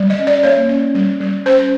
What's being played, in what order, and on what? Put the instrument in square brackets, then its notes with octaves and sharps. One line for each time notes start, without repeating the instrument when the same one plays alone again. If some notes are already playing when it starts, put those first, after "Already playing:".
Already playing: [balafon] G3
D#5
C#4
D5
A#3 C#5
C#4
G3
G3
C#4 C5